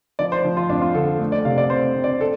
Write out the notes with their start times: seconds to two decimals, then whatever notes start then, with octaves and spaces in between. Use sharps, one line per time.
0.19 F3 D5
0.32 C5
0.45 F3
0.57 F4
0.69 F2 D4
0.82 F4
0.94 D3 A4
1.20 A3
1.32 D5
1.45 C3 F5
1.58 D5
1.70 C4 C5
1.95 C4
2.04 D5
2.21 A4